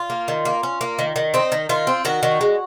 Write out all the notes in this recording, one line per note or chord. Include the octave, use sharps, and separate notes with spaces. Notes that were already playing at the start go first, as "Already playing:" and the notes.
Already playing: F4
A#3
D#3
A#3
C#4
A#3
D#3
D#3
C4 D#4
D#3
D#3 F4
C4
D#3 F#4
D#3
G#3